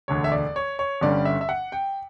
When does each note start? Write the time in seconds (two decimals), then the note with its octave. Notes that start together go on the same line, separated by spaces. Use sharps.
0.08 E1 D2 D3 C#5
0.24 E5
0.32 D5
0.56 C#5
0.79 C#5
1.01 G1 G2 D3 G3 C#4 D5
1.25 E5
1.41 E5
1.49 F#5
1.72 G5